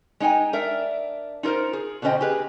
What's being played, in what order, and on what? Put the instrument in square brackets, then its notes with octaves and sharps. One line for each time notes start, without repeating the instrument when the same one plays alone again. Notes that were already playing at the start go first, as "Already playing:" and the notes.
[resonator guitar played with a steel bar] G#3 D#4 D5 G5 G#5
D4 A#4 E5
D#4 F4 A4 A#4 C5
G#4
B2 D3 C#4 C5 D#5 G5
G4 G#4 B4